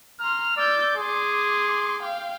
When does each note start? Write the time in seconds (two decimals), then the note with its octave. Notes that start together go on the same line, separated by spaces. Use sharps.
0.20 A#5 C6 F6
0.57 D5 E6 G6
0.97 G#4 C6 D6
2.03 F5 G5